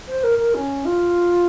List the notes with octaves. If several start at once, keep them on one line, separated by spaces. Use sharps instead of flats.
C5
A#4
A#4
C#4
F4